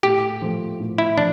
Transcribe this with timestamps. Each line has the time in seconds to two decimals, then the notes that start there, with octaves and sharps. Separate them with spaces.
0.03 A2 G4
0.42 F3 A3
0.80 A2
0.98 E4
1.17 F3 D4